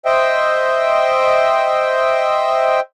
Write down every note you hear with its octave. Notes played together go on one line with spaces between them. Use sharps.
C5 D#5 E5 G5